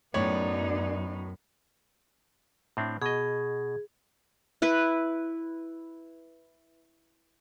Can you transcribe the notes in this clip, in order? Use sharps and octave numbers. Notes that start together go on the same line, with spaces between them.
F#2 A2 B3 D#4 C#5 D5
A2 C4 D4
B2 G#4 D#5
E4 B4